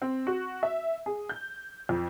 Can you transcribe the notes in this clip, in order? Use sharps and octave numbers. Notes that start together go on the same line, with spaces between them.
C4
F#4
E5
G#4
G6
F2